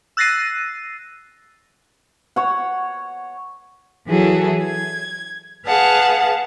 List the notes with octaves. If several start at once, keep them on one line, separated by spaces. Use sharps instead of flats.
E6 F#6 A6 A#6 C7 D#7
C#5 F#5
E3 F#3 E4 F#4 G#4 A4
G#6
G#4 B4 F5 F#5 A5